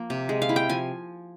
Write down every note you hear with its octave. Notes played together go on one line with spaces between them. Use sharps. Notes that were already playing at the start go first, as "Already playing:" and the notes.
Already playing: F3 A#3
C3
G#3
F5
E4
G5
F3 G#5